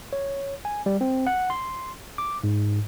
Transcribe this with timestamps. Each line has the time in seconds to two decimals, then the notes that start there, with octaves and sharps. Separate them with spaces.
0.13 C#5
0.65 G#5
0.86 G3
1.01 C4
1.27 F#5
1.50 C6
2.18 D6
2.44 G#2